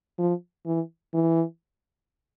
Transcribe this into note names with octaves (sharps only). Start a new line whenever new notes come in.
F3
E3
E3